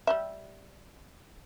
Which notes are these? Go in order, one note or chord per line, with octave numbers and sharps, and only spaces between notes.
G3 G4 E5